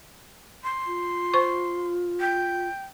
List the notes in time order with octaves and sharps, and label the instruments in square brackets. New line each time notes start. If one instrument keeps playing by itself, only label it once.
[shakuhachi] C6
[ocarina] F4
[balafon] C5 C#6
[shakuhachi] G5